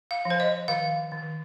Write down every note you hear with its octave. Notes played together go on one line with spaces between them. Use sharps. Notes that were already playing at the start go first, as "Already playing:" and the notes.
F5
F3
C5
D#5
D#3 F5
D#3